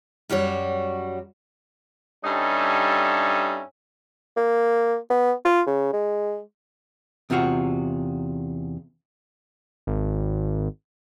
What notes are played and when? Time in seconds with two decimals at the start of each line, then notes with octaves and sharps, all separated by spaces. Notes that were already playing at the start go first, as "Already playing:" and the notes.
0.29 F#2 G3 F#4 C#5
2.23 G2 G3 C#4 D#4 A4 E5
4.37 A#3
5.10 B3
5.45 F4
5.66 C#3
5.93 G#3
7.30 E2 C3 F4 F#4 F5
9.87 G#1